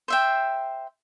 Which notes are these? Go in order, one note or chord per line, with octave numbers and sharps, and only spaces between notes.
C5 E5 G5